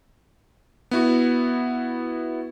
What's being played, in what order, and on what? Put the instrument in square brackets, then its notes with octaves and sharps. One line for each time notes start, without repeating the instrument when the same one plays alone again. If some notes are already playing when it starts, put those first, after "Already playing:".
[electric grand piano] B3 E4 F#4